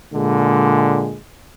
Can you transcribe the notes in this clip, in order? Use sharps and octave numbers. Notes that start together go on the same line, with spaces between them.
A#2 D3 G#3